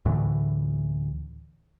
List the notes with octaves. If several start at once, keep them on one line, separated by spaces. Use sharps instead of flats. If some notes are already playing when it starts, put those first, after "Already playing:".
D2 A2 D3 E3